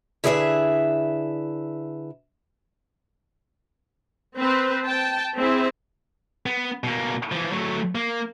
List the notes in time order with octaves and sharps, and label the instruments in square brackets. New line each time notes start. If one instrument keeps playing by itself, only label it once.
[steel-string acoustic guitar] D3 E4 G#4 B4 D5 E5
[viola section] C4 B4 C5
G5 A5
C4 E4 G#4 E5
[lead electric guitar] B3
B2 A#3
E3 F3
F#3 A3
A#3